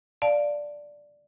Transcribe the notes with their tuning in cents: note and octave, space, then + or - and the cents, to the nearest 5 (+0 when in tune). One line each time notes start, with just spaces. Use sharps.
D5 +0 F5 +10 A5 +0